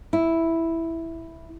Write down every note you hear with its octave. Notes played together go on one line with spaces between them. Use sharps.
E4